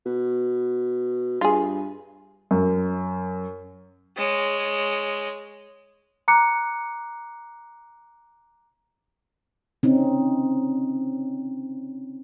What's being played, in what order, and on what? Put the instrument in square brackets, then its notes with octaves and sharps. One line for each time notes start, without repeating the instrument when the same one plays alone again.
[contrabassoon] B2
[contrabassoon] G2 [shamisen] F4 G#4
[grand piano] F#2
[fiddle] G#3 C#5
[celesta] A#5 D6 F#6 C#7
[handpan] C4 C#4 D#4